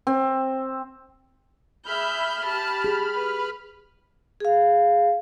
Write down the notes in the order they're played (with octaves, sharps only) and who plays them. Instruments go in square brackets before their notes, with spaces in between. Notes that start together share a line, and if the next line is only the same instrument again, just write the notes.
[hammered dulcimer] C4
[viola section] G#4 E5 [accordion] B5 F6 [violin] G6
[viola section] G4 [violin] A5
[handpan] G#4
[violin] B4
[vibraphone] G#4 F5